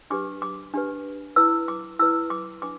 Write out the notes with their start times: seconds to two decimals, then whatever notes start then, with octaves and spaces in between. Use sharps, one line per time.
0.10 D4 G4 B4 D6
0.42 D6
0.74 D4 G4 B4
1.36 E4 B4 E6
1.68 D6
1.99 E4 B4 E6
2.30 D6
2.62 D4 B4 D6